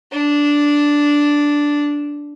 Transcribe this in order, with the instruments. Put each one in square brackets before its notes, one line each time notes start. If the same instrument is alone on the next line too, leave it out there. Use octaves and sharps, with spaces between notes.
[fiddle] D4